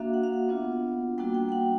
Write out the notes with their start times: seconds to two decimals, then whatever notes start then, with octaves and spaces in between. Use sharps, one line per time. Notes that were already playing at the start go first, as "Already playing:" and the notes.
Already playing: A#3 D4 F#4 E5 F5
0.14 F#5
0.23 F5
0.33 F#5
0.48 B3 D4 F4
1.18 G3 A#3 D4 F#4 G5
1.34 G5
1.49 G5
1.52 F#5